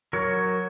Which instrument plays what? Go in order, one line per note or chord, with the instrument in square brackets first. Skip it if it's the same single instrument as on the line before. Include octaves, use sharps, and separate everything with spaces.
[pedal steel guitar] F#3 A#4 C#5